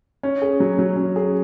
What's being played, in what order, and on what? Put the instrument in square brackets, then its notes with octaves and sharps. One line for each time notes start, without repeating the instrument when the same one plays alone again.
[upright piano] C#4
G#4
F#3
F#3
C#4
G#4